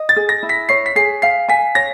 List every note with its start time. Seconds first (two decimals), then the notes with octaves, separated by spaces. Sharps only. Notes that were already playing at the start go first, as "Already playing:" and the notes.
Already playing: D#5
0.09 A6
0.16 G#4
0.29 A#6
0.43 E4
0.49 B6
0.69 C#5 C7
0.86 B6
0.96 G#4 C7
1.22 F5 C7
1.49 G#5 B6
1.75 C#5 A#6